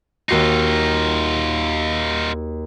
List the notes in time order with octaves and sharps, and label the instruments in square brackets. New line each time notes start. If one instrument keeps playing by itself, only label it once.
[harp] D#2 F#4 C7 [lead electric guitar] D#4 F4